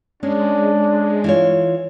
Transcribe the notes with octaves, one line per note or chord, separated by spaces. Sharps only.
G#3 C#4 D4
E3 F4 C#5